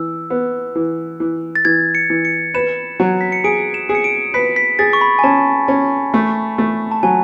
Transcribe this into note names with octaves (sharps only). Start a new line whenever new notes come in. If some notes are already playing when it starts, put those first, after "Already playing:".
Already playing: E3 E6
B3
E3
E3
A6
E3 G#6
C#7
E3
C#7
B4 E7
F#3
B6
C#7
G#4 D7
E7
G#4
C#7
D7
B4 B6
B6
G#4 A6
C#6
B5
G#5
C#4 A5
C#4
A3
A3
A5
F#3 G#5